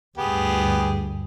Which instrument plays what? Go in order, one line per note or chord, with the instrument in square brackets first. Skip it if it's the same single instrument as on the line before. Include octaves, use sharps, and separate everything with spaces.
[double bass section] D2 G2 [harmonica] B3 G4 G#4